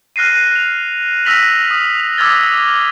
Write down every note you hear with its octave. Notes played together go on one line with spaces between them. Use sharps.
F6 F#6 A#6 C7 D#7
F7
E6 F6 A#6 B6 F7 F#7
D#6
F7
D6 E6 F6 G#6 A6 G7